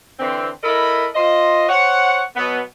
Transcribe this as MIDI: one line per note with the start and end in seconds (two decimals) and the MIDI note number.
0.19 0.48 50
0.19 0.48 52
0.19 0.48 60
0.64 1.07 64
0.64 1.07 69
0.64 1.07 70
0.64 1.07 75
0.64 1.07 83
1.15 1.69 65
1.15 1.69 72
1.15 1.69 75
1.69 2.22 72
1.69 2.22 73
1.69 2.22 78
2.35 2.60 47
2.35 2.60 54
2.35 2.60 59